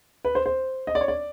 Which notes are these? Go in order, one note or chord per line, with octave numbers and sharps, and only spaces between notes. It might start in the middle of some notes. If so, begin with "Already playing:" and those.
B4
C5
C5
D#5
D5
C#5
D5